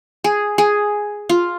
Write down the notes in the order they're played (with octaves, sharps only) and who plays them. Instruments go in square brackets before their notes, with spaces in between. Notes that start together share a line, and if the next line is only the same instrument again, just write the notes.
[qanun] G#4
G#4
F4